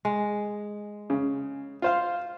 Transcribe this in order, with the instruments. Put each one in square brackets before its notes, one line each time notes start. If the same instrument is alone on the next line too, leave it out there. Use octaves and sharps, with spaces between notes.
[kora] G#3
[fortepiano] C#3
F4 C5 F5